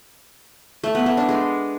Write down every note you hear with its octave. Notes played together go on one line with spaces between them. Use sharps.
A3
B3
A3
D4
G#3